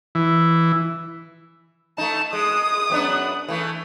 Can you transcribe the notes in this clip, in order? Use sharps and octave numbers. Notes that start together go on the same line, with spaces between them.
E3
A3 D#4 A5
G#3 D#6
F#2 B3 D4
E3 A3